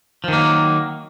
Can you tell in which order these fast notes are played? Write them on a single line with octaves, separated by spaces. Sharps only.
F3 D#3 A#3 F#3